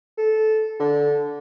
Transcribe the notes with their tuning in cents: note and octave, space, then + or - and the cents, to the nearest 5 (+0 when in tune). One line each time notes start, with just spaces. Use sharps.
A4 -15
D3 -10